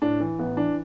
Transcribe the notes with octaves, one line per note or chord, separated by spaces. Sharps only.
A2 D4
E3
A1 B3
E3 D4